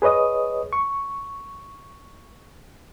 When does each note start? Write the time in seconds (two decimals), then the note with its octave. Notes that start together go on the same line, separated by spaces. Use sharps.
0.02 G#4 B4 C#5 D#5 D#6
0.73 C#6